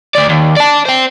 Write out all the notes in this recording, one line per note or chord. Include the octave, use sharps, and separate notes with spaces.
D2 D5
D#2
D5 A5
C5 G5